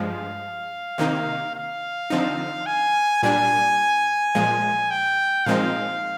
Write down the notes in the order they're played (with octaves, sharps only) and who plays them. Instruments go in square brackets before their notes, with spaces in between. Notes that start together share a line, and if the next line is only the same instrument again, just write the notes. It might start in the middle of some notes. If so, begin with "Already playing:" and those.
Already playing: [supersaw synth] G2 F3 G#3 [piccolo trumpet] F5
[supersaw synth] C3 D#3 A#3 D#4
[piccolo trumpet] F5
[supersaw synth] D3 F3 C4 D#4
[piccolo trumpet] G#5
[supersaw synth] A#2 G3 D4 [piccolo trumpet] G#5
[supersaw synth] A#2 F3 G#3
[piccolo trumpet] G5
[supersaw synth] A#2 F3 G#3 C4 D#4 [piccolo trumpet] F5